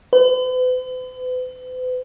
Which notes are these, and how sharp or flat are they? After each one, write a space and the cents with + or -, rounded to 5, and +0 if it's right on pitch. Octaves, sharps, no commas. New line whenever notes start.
B4 +45